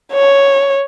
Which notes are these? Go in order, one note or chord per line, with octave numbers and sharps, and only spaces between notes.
C#5